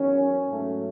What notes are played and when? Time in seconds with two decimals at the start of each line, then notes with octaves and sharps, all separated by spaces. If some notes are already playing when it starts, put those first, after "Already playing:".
Already playing: E2 D#3 F#3 C#4
0.51 G#2 F#3 A3